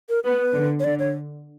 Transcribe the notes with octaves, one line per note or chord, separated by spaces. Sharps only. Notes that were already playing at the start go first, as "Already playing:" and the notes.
A#4
B3 B4
D3
C#5
D3 D5
C#5